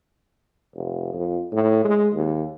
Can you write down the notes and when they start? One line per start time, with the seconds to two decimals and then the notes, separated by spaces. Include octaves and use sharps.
0.75 F1
1.13 F2
1.52 A2
1.84 G#3
2.14 D#2